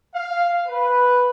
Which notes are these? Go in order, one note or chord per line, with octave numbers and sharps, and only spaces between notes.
F5
B4